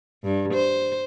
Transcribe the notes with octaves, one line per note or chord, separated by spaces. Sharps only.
G2
C5